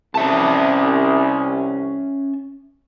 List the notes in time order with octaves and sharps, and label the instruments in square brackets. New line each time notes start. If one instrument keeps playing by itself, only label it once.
[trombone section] C2 [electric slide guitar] C#4 E5 A5